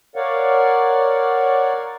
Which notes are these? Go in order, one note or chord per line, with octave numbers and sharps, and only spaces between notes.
A#4 C#5 D5 F5 F#5